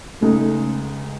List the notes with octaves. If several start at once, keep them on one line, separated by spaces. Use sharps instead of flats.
C#2 C#3 G#3 A3 D#4